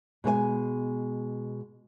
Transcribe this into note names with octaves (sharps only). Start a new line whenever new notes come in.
B2 G#3 C#5 G#5